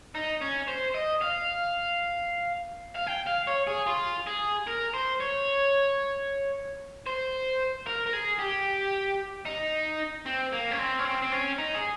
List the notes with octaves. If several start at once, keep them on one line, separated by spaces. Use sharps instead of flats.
D#4
C#4
C5
D#5
F5
F5
G5
F5
C#5
G#4
F4
G#4
A#4
C5
C#5
C5
A#4
A#4
G#4
G4
D#4
C4
A#3
C#4
C4
C#4
C4
C4
C#4
D#4
G#4